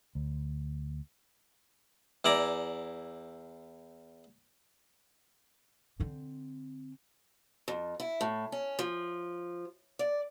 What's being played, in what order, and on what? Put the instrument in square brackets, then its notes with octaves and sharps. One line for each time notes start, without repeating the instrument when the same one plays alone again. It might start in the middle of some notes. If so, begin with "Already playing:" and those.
[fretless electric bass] D2
[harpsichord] E2 E4 D5 A#5
[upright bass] D3 C4
[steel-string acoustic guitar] F2
E4
A2
C#4
F3
D5